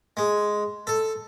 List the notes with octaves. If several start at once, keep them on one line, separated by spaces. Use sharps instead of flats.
G#3
A4